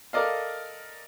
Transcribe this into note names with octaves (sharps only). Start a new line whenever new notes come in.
A4 A#4 D5 D#5 F5